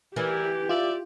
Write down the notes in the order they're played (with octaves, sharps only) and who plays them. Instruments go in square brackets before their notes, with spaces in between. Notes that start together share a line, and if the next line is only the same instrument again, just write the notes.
[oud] E3 [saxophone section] G3 E4 A#4 [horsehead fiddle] G4
[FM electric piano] F4 [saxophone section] D5 E5